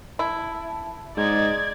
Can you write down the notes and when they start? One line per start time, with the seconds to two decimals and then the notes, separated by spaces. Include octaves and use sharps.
0.19 E4 A5
1.17 G#2 D5 D#5 G#6